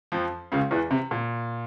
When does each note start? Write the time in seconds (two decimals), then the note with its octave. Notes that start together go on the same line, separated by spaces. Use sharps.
0.12 F2 F3
0.52 C#2 C#3
0.71 E2 E3
0.91 C3
1.11 A#2